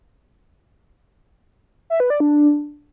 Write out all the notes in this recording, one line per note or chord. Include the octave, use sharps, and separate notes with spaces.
E5
B4
D5
D4